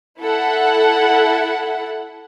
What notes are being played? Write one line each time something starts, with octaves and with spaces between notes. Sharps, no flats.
E4 A4 F#5